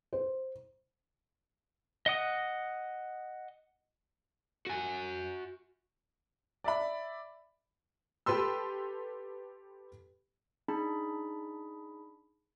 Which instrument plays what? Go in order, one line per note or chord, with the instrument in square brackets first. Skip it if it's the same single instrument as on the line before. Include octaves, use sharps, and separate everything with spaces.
[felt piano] C5
[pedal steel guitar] D#5 F#5 D#6
[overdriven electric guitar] F#4 G#5
[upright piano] D5 E5 B5
[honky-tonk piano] G4 A4 B4 B5 C6 E6
[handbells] D4 D#4 G#4 A5 B5